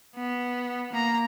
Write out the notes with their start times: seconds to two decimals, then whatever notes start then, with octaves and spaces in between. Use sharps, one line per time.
0.15 B3
0.92 A#3 A#5